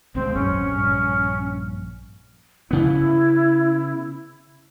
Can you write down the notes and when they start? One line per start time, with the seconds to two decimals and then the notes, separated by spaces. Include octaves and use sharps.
0.15 A#1 D#2 G#3 C4
0.34 D#1 G#1 F#2 C#4
0.62 A#1 G2
2.71 C#3 B3 E4